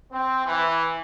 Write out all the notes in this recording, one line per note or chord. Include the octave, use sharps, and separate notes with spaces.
C4
E3